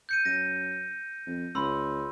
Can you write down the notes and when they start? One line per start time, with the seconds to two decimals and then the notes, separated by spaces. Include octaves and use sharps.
0.09 G6 C#7 D#7
0.25 F#2 A#6 D#7
1.26 F2
1.55 C#2 B5 C6 E6